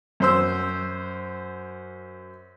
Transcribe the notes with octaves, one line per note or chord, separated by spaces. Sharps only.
F#2 C5 E6